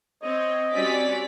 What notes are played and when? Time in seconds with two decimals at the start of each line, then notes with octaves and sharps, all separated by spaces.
0.23 C4 C#5 D#5
0.73 G3 C4 C#4 F#4 D5 B6